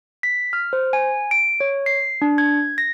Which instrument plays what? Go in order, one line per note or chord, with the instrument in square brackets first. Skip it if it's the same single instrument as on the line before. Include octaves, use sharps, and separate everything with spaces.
[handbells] B6
F6
C5
G#5
D7
C#5
C7
D4
G#6
A#6